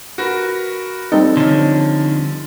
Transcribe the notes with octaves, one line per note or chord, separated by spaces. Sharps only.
F#4 A#4 B4
G3 C4 D#4 A4
D3 F3 C#4